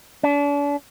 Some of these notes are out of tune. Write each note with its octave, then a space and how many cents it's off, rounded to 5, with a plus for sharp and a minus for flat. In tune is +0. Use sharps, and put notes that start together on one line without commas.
D4 -40